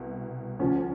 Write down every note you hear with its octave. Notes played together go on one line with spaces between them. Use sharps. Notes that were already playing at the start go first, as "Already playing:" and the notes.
Already playing: C2 B2
D2 C#3 F3 C#4